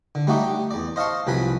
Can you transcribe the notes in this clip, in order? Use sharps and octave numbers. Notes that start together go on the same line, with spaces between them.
D3
G3 A3 D#4 F#4 G4 D5
G4
E2 D5
C5 D#5 F5 A5 C6 C#6
C2 F3 F#3 B4 G#5 B5